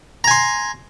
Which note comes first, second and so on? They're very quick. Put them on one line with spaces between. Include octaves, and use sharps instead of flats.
A#5 G#5 C6